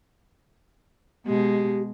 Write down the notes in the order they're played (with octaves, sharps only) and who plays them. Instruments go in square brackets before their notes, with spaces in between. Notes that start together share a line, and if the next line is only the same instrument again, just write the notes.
[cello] B2 G#3 [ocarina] G4